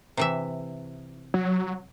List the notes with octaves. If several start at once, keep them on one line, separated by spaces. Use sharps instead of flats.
C3 E3 E5
F#3